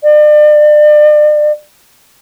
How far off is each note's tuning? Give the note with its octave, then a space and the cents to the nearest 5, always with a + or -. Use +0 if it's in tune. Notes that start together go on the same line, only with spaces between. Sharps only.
D5 +40